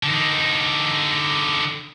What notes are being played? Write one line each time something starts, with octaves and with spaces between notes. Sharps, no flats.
D3 D#4